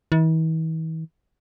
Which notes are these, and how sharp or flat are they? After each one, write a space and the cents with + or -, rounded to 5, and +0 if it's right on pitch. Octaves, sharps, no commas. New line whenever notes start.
E3 -45